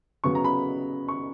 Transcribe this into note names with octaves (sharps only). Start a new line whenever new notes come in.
C#3 F#3 B3 C#6
A#5
B5
C#6